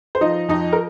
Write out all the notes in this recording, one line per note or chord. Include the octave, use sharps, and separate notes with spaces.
C5
F3 D#4 D#5
F2 D#4 D#5
A#4